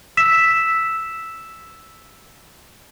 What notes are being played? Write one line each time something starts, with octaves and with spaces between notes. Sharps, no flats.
E6 B6 E7